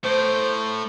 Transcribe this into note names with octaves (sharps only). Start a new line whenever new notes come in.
A2 C5